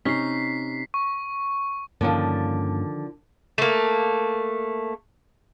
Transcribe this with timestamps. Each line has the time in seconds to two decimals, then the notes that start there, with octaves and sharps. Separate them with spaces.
0.05 C3 C#4 D#4 B6 C7
0.94 C#6
2.01 G2 D3 D#3 F3 A#3 C#4
3.58 A3 A#3